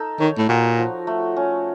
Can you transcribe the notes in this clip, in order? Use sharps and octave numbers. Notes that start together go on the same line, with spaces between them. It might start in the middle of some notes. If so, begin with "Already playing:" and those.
Already playing: D#4 A4 F5
D#3 C#5
A2
A#2 F#4
F3
A3
C#4